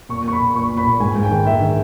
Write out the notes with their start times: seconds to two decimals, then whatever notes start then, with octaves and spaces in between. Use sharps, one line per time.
0.09 A#2 C#6
0.24 A#2 C#6
0.32 B5
0.40 A#2
0.55 A#2 C#6
0.69 A#2
0.77 B5
0.86 A#2
1.00 G#2 G#5
1.15 G#2
1.23 G5
1.31 D#3
1.45 G#2 E5
1.61 D#3